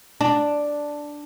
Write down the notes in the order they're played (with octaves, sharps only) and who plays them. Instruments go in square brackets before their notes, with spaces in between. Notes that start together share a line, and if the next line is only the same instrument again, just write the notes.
[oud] D4